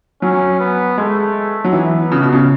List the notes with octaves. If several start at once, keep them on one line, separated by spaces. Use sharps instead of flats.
F#3 C#4
B3
G#3 A3
F#3
E3 B3
C#3
B2
C#3